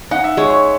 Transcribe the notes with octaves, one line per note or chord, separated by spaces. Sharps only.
D#4 F#5
E5
G#3 C#5
C#5